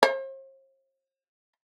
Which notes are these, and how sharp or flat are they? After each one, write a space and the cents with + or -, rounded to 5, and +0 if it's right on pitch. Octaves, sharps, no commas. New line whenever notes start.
C5 +45